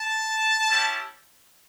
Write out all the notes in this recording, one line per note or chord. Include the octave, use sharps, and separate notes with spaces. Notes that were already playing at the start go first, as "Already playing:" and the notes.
Already playing: A5
C#4 E4 G4